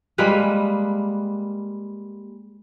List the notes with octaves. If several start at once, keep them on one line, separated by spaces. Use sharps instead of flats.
G3 G#3 A#3 B4